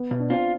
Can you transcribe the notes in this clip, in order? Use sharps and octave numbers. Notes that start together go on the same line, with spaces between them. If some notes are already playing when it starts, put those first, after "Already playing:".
Already playing: B3
B2
D4
C4 F4